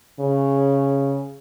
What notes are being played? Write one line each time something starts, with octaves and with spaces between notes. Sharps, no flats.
C#3